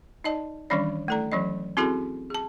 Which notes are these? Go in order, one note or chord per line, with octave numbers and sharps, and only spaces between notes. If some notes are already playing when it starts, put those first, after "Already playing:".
D#4 D5 D#5 A5
D#3 E3 G3 C#4 D4 D5
A3 E4 A4 D5 A#5
E3 F#3 C#4 D#5
C4 C#4 E4 F#4 G#4 A4
G#4 A5